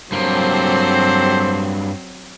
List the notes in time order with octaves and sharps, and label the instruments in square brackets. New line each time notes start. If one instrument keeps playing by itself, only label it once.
[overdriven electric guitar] G2 A#3 [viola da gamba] F#3 C4 [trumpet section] G4 A4 C5